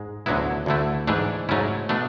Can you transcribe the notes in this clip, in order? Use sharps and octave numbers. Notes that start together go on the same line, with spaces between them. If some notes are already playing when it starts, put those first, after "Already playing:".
Already playing: G#2 G#3
D2 D3 F#3 B3 E4
D2 D3 A3 E4
G#2 E3 A3 D4
G#2 F#3 A3 C#4 E4
B2 A3 D4